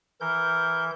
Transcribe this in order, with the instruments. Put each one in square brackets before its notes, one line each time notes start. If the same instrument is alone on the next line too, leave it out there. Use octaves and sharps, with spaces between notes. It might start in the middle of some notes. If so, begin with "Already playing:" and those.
[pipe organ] E3 G6 [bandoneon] A#4